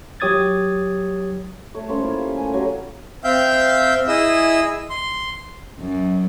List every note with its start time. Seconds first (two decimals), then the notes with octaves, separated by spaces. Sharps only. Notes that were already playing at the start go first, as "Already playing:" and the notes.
0.20 F#3 G4 C#5 D#6 G#6 A6
1.74 A3 C#5
1.88 A#3 C#4 A4 C5
2.03 E4 F4
2.18 G4
2.33 A3 G#5
2.54 F#3 G4
3.24 C4 E5 F5 G5 G6
4.08 E4 G#4 D#5 E6
4.90 C6
5.80 F#2